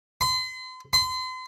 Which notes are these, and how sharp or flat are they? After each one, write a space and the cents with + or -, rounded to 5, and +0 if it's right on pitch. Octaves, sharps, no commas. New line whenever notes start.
C6 -40
C6 -40